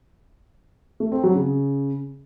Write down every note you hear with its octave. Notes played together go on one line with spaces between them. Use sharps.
A3
C4
F#3
C#3